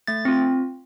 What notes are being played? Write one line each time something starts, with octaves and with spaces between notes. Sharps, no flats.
A3 A6
C4 F4